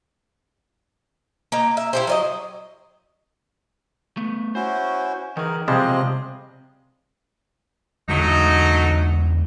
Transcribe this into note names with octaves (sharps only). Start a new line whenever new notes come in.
A#3 D#4 A#5
E5
E4 G4 C5
F#3 D5 D#5
A3 B3
C#4 E4 F#4 C5
D#3 E3 G#4 A#4
C3 F3 G3 G#3 C4 D#5
E2 D3 F#3 G#3 A3 D#4